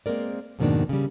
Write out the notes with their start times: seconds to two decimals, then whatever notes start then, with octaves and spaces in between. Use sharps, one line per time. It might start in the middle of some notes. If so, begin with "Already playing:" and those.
0.06 G#3 A#3 C4 A#4 D5
0.59 F2 G#2 B2 D#3 A#3 D4
0.89 C#3 G3